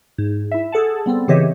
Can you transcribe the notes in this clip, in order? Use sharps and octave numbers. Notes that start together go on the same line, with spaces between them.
G#2
E4 E5
G#4 A4 F#5 A5
G3 B3 C4 A4
C#3 E3 G4 C#5 D#5 E5